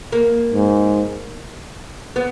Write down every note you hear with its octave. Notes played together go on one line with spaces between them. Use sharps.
A#3
G#2
B3